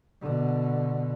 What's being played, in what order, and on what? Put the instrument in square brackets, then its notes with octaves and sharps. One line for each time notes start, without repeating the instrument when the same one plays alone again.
[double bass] B2 D3